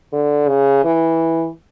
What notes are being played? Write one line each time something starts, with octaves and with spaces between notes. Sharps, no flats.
D3
C#3
E3